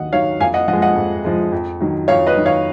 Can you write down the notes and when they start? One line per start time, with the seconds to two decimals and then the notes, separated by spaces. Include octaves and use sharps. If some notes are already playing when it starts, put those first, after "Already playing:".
Already playing: D#2 D#3 F#3 D#5 F#5
0.12 D#3 F#3 C#5 F5
0.40 F2 F5 G#5
0.54 D#5 F#5
0.68 F3 D#5 F#5
0.73 G#3
0.82 D#5 F#5
0.96 F2
1.25 F3 G#3
1.52 F2
1.81 D#3 F#3
2.08 F2 C#5 F5
2.27 B4 D#5
2.36 D#3 F#3
2.46 C#5 F5